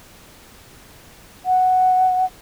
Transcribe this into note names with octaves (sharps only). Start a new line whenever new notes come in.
F#5